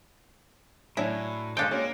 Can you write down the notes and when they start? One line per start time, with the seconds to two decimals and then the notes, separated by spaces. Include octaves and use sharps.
0.97 A2 F#3 C#4 D4 E4
1.57 A#2 G#3 D4 A4 F5 G5
1.71 G#3 A#3 C#4 F#4